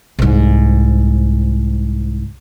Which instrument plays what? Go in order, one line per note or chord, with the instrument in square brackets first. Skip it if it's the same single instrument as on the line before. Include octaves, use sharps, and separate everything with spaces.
[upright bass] C2 G#2